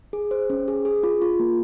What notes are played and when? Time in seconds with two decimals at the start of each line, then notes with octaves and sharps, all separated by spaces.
0.13 G#4
0.31 C5
0.50 C#4
0.68 G#4
0.85 G#4
1.03 F4
1.22 F4
1.39 A#3